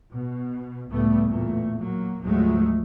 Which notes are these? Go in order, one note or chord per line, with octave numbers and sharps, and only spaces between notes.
B2
C#2 A2 G3 A3 B3
E2 A#2 A3
F#3 A#3
D2 G#2 F3 F#3 G#3 A3